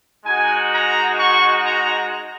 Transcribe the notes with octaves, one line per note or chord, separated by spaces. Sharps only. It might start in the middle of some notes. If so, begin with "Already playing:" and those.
G#3 D#4 F#4 G#5
A#5
C#6
A#5